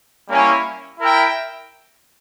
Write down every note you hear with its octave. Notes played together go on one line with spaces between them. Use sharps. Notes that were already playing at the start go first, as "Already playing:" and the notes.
G3 A#3 C#4 E4
E4 A#4 E5 G5